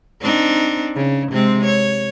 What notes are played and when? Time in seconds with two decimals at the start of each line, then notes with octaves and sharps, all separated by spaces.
0.21 C4 D4 D#4
0.95 C#3
1.32 C3 G#3 C4
1.65 C#5